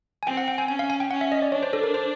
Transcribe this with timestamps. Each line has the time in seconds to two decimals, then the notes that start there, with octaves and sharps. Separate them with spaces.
0.23 G#5
0.26 C4 G5
0.37 F#5
0.48 G5
0.58 G#5
0.68 C#4 G#5
0.79 F5
0.90 G#5
1.00 G5
1.11 C#4 F#5
1.21 E5
1.32 D#5
1.42 D5
1.52 D4 C#5
1.63 C5
1.73 A4
1.83 A#4
1.94 C5